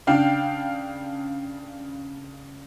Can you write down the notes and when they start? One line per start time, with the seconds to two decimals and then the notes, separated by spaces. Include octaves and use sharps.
0.07 C#3 D4 F5 G5